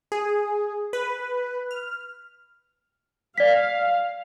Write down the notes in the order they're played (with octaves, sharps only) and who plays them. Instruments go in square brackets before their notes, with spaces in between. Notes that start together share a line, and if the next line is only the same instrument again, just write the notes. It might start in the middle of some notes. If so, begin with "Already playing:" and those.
[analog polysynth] G#4
B4
F6
[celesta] D5 B6 [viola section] F5